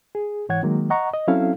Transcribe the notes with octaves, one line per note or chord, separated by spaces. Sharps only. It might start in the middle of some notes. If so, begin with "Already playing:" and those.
G#4
G#2 E3 C#5 F#5 G#6
D#3 F#3 G#3 A#3
D#5 F#5 A#5 C#6
D#5
F#3 C4 C#4 E4 A4 F5